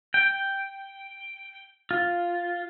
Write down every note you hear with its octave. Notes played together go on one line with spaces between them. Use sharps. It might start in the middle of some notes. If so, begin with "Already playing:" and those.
G5
F4